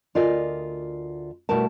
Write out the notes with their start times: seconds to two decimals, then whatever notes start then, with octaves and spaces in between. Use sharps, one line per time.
0.15 D2 F4 A#4 D5 D#5 G#5
1.49 B2 G3 A3 E4 A#4 A5